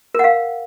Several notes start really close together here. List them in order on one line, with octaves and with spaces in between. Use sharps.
A#4 F#5 F5